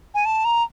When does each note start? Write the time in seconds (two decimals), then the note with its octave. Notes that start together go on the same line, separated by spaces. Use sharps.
0.14 G#5
0.25 A5
0.45 A#5